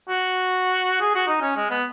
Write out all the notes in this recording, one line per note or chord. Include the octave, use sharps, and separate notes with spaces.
F#4
G#4
F#4
D#4
C#4
G#3
B3